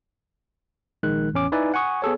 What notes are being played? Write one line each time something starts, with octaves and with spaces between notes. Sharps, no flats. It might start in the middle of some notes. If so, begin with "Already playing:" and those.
A#1 D#3 G#3 F#6
A1 E2 C#4 D6
D#4 E4 B4 D5 E5 G#5
F#5 G#5 C#6 D#6
B3 G#4 A4 C#5